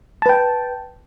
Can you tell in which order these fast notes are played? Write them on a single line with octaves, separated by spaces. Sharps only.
A5 B4 G5